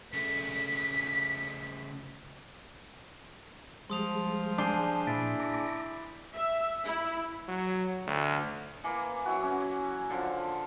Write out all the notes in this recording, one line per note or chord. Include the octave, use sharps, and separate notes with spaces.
C#3 A3 B6
F3 G3 G#3 C6 D#6 F7
D4 G#4 G6 C7 G7
A#2 E4 A6 B6 D7
A#5 D6
E5
E4
F#3
D2
E3 A#3
F#3 E4 F#4
C#4
D3 F3